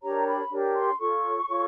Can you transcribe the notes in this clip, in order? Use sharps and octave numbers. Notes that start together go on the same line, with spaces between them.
D4 G4 A#4 C#5 A#5
B5
D4 G4 A#4 C#5
C6
F4 A4 C#5 C#6
F4 A4 C#5